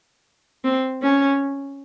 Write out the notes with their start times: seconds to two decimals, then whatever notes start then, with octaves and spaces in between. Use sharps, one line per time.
0.64 C4
1.02 C#4